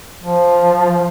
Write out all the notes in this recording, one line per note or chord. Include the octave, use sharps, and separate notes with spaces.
F3